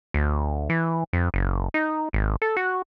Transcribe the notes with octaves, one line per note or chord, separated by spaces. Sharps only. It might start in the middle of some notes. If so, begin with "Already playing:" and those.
D2
E3
F2
F#1
D#4
G#1
A4
F#4